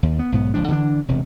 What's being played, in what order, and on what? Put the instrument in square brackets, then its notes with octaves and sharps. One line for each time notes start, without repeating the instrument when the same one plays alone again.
[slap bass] D#2
B3
B1 G#2 B3
F#1 C#2 F3 D4
D3 E3 C#4 D4
E1 C3